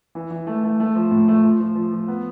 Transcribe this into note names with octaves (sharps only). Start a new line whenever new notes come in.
E3
E3
A3
A3
A3
F3
A2
A3
F3
F3
F3
F3
B3